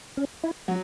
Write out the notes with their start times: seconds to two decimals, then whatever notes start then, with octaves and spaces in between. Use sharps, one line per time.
0.17 C#4
0.44 E4
0.68 F#3 F#4